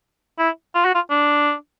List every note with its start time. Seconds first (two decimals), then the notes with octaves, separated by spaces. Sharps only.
0.39 E4
0.75 F4
0.85 F#4
0.95 F4
1.10 D4